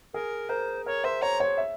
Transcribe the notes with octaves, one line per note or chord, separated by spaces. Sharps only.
G#4 A#4
A#4 C5
A#4 C#5
C5 E5
C#5 A#5
C#5
E5